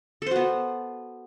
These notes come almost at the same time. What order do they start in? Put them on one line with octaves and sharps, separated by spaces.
A4 C5 F#4 B3